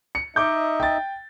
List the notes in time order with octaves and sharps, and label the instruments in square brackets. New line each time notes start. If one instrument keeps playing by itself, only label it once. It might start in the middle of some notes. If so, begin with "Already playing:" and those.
[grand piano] C#7
[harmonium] D#4 D#5 E5 [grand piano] D6 G6
[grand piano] G5 A6